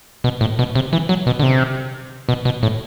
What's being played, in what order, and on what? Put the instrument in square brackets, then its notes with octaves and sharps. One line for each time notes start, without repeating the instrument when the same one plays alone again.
[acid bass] B2
A2
B2
C3
E3
F#3
B2
D3
C3
B2
B2
A2